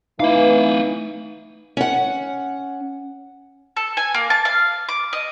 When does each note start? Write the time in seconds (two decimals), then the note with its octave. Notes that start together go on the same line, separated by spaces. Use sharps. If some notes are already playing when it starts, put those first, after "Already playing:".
0.20 E3 A3 D#4 F5
1.77 C#4 F#5
3.77 A4
3.97 G#5
4.14 A#3
4.30 A5
4.45 F5
4.89 D6
5.13 D#5